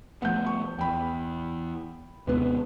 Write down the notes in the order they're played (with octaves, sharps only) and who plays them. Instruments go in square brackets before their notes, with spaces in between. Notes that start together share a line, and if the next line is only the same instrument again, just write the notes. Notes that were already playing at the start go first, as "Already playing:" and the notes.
[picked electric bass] F3 A3 B3 [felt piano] F#5 G6
[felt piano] C#6
[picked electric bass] E2 [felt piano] G5 B5
[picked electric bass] D#2 C3 G#3 [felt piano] B3 B4